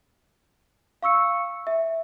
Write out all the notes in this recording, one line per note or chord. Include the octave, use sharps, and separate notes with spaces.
F5 C#6 E6 C#7
E5